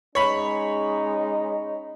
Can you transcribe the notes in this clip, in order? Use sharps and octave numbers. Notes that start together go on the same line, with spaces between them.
G#3 C#4 D#4 C#5 B5